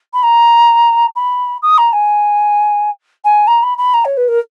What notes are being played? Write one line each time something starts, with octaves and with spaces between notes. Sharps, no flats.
B5
A#5
B5
D#6
A#5
G#5
G#5
A#5
B5
B5
A#5
C#5
B4
A#4